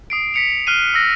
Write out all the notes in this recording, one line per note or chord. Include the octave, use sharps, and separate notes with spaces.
D#6 C7 D7
B6 C#7 F7
F6 F#6 C7 D#7
E6 A#6 C#7